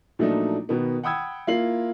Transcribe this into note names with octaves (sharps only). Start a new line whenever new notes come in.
A#2 F3 F#3 A3 D4 D#4
B2 D#3 B3
F#5 G5 B5 D#6 E6 G#6
A#3 E4 F4 C7 F#7